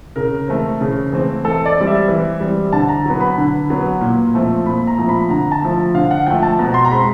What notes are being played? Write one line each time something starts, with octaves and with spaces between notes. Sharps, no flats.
C#3 A#4
E3 A3 C4
C#3
E3 A3 C4
E3 A4
D5
G3 C4
E5
E3
G3 C4
D3 A5
A#5
F#3 B3
B5
D3
F#3 B3
A#2
F3 A3 C4
A#2 B5
A#5
F3 A3 C4
B5
D3 A#5
A5
F3 A3
D3 F5
F#5
F3 A3 G5
A5
B2 A#5
C6
A#5
G#3 C4 B5